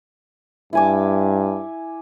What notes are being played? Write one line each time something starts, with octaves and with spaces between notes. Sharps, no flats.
G2 E4 G#5 D6